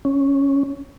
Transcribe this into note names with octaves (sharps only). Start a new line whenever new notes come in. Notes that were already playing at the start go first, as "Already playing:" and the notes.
C#4